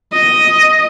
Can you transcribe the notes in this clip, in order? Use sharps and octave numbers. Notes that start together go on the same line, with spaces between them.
D#5